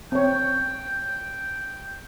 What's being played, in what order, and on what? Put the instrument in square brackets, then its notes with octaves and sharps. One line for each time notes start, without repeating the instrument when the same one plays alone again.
[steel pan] C4 C#5 [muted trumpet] G5